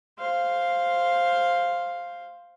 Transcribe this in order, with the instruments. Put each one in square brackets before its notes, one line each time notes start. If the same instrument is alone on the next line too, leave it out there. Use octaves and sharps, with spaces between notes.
[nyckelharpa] C5 F5